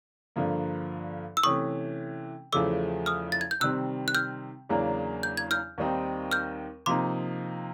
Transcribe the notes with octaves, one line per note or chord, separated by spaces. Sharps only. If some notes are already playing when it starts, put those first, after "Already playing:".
G2 D3 F3 A#3
E6
C3 E3 A3 C#4 C#6 D#6
E2 C#3 F3 A3 D6 E6
D#6 F6
A6
G#6
G6
C3 D#3 G3 C4 E6 F#6
F#6
F6 G6
E2 C#3 F#3 A#3 D4
G6
G#6
F6 G6
D#2 D#3 G3 C4 D#4
F6 G6
C3 F3 A#3 D#4 C6 D6